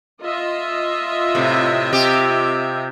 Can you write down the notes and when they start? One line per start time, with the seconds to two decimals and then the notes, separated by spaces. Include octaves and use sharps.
0.20 F4 D#5 E5
1.35 A2 C3
1.92 C3 G4